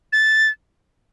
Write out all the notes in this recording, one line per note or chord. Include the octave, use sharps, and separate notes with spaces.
A6